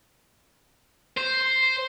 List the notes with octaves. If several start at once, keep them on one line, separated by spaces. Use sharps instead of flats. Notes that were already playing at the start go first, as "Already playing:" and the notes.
C5